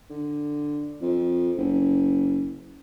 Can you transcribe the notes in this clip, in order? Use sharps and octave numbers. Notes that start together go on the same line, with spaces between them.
D3
F2
F#1